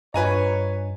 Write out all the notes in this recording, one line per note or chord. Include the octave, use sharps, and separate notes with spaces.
G2 F4 B4 C#5 D#5 G#5 A#5